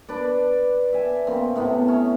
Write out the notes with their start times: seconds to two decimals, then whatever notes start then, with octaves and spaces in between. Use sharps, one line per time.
0.09 D4 B4 D5
0.93 E5 G#5
1.27 C#3 A#3 C4
1.56 A2 C3 B3
1.88 C#4